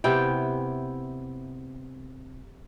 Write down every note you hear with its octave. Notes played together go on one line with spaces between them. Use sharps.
C3 B3 E4 G5